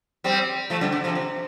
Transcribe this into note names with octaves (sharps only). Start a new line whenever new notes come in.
G3 C4
F3 A3
D3 G3
D3
C3 F3
C3